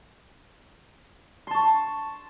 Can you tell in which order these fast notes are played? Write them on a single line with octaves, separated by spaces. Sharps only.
C6 A5 C#6